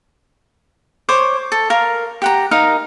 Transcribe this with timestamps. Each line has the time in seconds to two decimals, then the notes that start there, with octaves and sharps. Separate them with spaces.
1.09 C5 C#5 D6
1.52 A4
1.70 A#4 F5
2.22 G4 F#5 A#5
2.51 D#4 A#4 F5